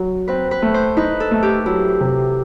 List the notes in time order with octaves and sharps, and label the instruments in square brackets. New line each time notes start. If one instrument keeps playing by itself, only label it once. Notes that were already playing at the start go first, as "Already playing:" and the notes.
Already playing: [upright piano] F#3
[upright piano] C4 [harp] B4
[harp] B4
[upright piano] A3
[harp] C5
[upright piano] D#4 [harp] B4
[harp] A4
[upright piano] A3
[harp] G4
[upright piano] F#3 [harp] E4
[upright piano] C3